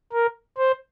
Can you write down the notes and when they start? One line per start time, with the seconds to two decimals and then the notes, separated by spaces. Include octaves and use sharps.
0.13 A#4
0.58 C5